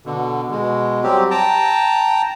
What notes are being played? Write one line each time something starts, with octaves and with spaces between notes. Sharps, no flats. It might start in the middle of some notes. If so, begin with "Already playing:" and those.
B2 D3
B2 G#3
F#3 G3 C4 G4
G5 A5 A#5